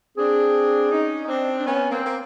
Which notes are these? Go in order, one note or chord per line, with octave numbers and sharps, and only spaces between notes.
C4 D4 G#4
C#4 D#4
D#4
C4 D4
D4
B3 C#4
A#3 C4
A#3